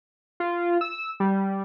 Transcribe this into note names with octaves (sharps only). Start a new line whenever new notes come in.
F4
E6
G3